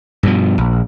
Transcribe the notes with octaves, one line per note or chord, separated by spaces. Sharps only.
G2 B2 F3
A#1